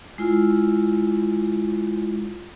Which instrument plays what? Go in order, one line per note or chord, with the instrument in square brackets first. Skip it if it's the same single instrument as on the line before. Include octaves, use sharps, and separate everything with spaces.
[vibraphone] G#3 E4 F4